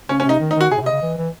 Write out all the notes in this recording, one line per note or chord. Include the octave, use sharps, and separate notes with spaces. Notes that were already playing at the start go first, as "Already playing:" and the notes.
C#3 C#4
C#4
C3 D#4
D#3
D#4
D#3 F#4
C3 G#4
A2
C3
D#5
C#3
E3
E3